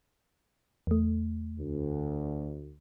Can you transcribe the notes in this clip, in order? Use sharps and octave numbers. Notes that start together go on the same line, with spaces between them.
E2 A3
D2